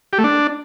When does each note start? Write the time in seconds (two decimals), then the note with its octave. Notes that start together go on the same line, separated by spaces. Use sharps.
0.13 G4
0.18 A3
0.24 D4